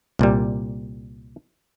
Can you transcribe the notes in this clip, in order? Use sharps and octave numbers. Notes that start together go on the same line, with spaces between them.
C2 A#2 G3